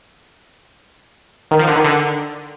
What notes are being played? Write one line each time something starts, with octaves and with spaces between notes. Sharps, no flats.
D#3
F3
D3
D#3
D3